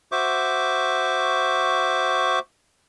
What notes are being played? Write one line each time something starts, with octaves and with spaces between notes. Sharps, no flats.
F#4 C5 E5 C#6 D6